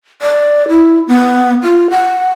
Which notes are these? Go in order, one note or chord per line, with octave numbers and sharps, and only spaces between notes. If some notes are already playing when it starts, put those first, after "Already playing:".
D5
E4
B3
F4
F#5